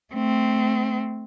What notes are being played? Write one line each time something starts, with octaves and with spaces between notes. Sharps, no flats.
A3 C4